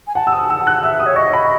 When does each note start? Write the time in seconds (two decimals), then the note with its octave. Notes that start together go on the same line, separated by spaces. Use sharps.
0.07 G#5
0.15 F#5 A5
0.27 E6
0.32 D#6
0.50 F#5 E6
0.67 F#6
0.83 E5 E6
1.00 D#6
1.06 C#5
1.16 D#5 C#6
1.33 B5